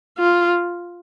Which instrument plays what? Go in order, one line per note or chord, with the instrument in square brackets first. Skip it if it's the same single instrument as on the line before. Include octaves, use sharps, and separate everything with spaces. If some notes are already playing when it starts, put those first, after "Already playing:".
[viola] F4